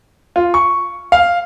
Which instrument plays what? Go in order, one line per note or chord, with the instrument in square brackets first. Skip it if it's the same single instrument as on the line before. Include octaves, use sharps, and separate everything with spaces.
[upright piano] F4
C#6
F5